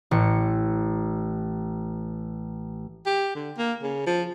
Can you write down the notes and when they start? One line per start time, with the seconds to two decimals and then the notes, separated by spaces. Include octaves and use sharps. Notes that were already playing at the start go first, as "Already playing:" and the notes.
0.11 A1 C#7
3.06 G4
3.35 D3
3.57 A#3
3.83 C#3
4.06 F3